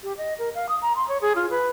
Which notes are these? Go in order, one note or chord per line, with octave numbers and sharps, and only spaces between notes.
G4
D#5
A#4
F5
D#6
A#5
C6
C#5
G#4
F4
B4